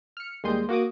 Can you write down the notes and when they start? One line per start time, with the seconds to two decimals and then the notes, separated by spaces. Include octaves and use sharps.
0.17 F6 C#7
0.44 D#2 G3 G#3 C6 D#6 G6
0.69 A#3 F#4 D6 D#6